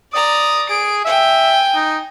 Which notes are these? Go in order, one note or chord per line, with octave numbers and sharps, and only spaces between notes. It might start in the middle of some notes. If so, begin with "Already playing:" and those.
D5 A#5 D#6
G#4 D7
E5 G5 G#5
D#4